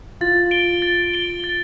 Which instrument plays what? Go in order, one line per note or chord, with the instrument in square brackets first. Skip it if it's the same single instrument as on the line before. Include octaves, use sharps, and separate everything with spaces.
[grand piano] F4 [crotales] A6
[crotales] D7 G7
A6
D7 G7
A6